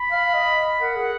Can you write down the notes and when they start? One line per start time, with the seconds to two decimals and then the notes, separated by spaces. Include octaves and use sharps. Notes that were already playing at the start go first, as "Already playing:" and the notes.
Already playing: B5
0.11 F5
0.34 D#5
0.81 A#4 F#5
0.96 G#4